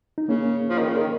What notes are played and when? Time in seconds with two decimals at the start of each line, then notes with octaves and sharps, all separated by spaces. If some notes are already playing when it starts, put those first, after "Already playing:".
0.18 D#4
0.28 C#3 A#3 C#4
0.69 F3
0.79 D#3
0.88 C#3
0.96 D#3